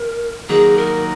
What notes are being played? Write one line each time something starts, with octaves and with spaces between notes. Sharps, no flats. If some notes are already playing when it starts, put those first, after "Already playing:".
Already playing: A#4
D#3 F#3 A#3 G#4
A#4